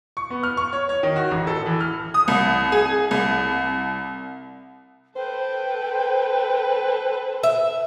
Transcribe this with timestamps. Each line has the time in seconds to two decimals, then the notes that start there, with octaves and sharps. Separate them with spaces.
0.17 C#6
0.30 B3
0.43 F6
0.57 C#6
0.73 C#5
0.89 C#5
1.03 D#3
1.16 F#4
1.31 A1
1.47 A4
1.66 E3
1.80 F6
2.14 D#6
2.28 C2
2.72 G#4
3.11 C2
5.16 A4 B4 C5 G5
7.43 E5